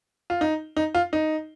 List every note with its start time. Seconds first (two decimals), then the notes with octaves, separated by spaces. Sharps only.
0.30 F4
0.41 D#4
0.76 D#4
0.95 F4
1.13 D#4